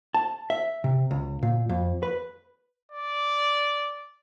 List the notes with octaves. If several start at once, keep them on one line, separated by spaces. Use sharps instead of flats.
A5
E5
C3
C#2
A#2
F2
B4
D5